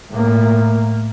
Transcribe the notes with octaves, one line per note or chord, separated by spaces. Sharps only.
A2 A#3